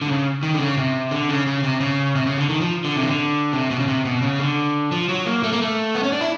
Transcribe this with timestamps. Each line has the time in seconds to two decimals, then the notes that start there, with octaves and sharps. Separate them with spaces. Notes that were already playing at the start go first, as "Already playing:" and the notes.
0.02 D3
0.08 C#3
0.43 D#3
0.54 D3
0.60 C#3
0.77 C3
1.11 D3
1.29 C#3
1.47 C#3
1.63 C3
1.80 C#3
2.15 C3
2.26 C#3
2.38 D3
2.49 D#3
2.61 F3
2.84 D3
2.96 C3
3.03 D#3
3.07 D3
3.53 C3
3.71 B2
3.80 C#3
3.88 C3
4.05 B2
4.22 C#3
4.40 D3
4.92 F3
5.09 F#3
5.26 A#3
5.43 A3
5.52 A#3
5.61 A3
5.95 B3
6.03 C#4
6.12 D4
6.21 E4